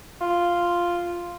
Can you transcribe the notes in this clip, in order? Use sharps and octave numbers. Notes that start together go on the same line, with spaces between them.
F4